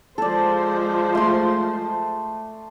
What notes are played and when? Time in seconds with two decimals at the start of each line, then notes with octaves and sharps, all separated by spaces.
0.18 F3 G#3 A4 C5 D5
1.15 A3 C6